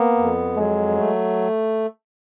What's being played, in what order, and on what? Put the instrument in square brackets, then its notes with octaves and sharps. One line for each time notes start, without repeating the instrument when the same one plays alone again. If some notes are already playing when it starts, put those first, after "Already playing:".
Already playing: [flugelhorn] A#3 [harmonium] B3
[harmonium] F2
[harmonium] F#3 [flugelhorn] G#3
[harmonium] A3